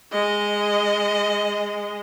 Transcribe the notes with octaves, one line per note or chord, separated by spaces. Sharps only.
G#3 D#5